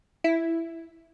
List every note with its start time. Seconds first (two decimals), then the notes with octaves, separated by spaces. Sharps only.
0.24 E4